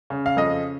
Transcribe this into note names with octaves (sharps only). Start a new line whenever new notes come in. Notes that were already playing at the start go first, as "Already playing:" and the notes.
C#3
F5
F2 D#5